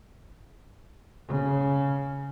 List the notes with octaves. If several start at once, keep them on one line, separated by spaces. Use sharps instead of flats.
C#3